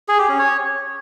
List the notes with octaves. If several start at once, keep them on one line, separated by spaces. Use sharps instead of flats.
G#4
G4
C#4
C#5